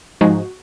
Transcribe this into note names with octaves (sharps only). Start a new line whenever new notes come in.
G#2 F3 G#3 D#4 F#4